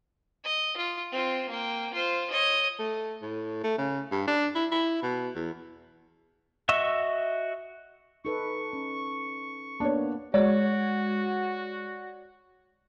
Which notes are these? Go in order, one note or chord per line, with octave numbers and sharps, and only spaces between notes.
D#5
F4
C4 F4
A#3 G5
F4 C5
C#5 D#5
A3
A2
A3
C#3
G2
D4
E4
E4
B2
E2
F#4 D#5 E5 C#6 E6
D#4 A4 B4 C#6
C#4
A#3 B3 D4 C#5
G#3 F#4 C#5 D5